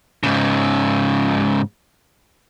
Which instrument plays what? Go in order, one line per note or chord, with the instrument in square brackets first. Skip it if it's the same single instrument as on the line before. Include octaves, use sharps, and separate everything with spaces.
[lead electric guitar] G#2 C#3